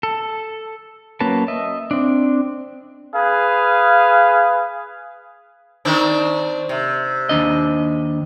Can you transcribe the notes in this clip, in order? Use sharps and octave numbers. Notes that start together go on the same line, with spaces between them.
A4
F#3 A#3 C#4 B4 A5
D#5 E5
C4 D4
G#4 B4 F5
D#3 C4 D4
C3
D#2 D4 D#5